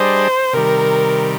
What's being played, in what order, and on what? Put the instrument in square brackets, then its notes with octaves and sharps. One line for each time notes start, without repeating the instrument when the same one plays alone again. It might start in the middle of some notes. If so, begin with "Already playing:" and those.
Already playing: [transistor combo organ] G3 D4 G#4 D#5 [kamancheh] C5
[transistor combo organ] C3 D#3 G3 [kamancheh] A#4